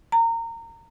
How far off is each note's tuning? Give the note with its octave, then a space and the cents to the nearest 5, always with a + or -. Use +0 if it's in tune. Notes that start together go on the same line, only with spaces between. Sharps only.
A#5 -25